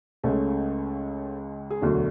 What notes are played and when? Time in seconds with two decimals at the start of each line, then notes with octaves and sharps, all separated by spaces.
0.24 C#2 C#3 G#3 A3 C#4
1.70 G#4
1.82 E1 D2 D3 F#3 D4 F#4